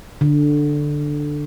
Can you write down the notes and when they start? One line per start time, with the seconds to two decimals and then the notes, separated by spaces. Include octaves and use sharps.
0.21 D3